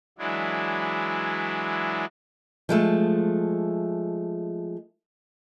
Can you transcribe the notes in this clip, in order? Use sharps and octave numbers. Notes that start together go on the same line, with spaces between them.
E3 F#3 G#3 D4 E4
F3 G#3 A3